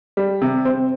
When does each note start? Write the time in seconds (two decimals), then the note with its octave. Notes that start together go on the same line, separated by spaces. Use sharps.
0.17 G3
0.42 C3
0.65 C4